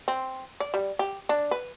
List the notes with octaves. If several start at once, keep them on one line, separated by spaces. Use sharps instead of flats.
C4
D5
G3
G4
D4
B4